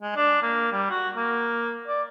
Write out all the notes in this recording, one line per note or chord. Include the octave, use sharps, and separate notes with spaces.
G#3
D4
A#3
G3
F#4
A#3
D5